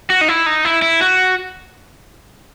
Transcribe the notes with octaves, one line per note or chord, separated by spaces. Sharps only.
F#4
D#4
E4
D#4
E4
E4
F#4